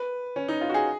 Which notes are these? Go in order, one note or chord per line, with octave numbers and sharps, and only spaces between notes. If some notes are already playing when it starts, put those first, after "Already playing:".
Already playing: B4
C#4
D#4
F4
F#4
G#4